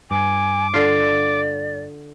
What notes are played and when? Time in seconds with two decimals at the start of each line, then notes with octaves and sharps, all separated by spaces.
0.11 G2 G#5 D6
0.74 D3 F4 D5